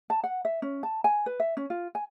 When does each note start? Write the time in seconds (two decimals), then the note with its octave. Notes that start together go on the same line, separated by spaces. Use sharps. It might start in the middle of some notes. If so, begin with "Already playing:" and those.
0.10 A5
0.24 F#5
0.45 E5
0.62 C#4
0.83 A5
1.04 G#5
1.26 B4
1.40 E5
1.57 C#4
1.70 F4
1.95 G#5